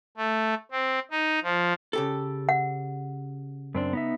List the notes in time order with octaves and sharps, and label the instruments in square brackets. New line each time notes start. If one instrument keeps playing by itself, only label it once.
[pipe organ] A3
C4
D#4
F3
[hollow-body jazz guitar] C#3 G4 A4
[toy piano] F#5
[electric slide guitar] F#2 C4 D4
B3 D#4 E5